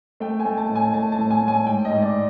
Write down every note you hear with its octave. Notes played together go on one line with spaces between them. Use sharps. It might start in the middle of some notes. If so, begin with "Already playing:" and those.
A3 G5
G#5
A3
A5
A2
G#5
A3 A5
A5
A2
G#5
A2
G#5
G#2 G5
D#5
G#2
D5